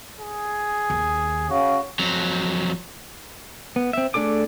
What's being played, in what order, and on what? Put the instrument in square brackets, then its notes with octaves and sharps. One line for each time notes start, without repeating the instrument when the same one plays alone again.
[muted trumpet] G#4
[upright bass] D#2
[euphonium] C#3 [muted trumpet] F#4
[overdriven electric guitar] F2 F#3
[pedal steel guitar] B3
C4 E5
A3 D4 G#4 A4 D6